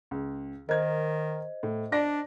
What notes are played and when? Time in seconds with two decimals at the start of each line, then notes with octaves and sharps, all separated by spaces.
0.11 C#2
0.69 D#3 A#4 C5 D#5 G#6
1.63 A2
1.92 D4 D5 A#6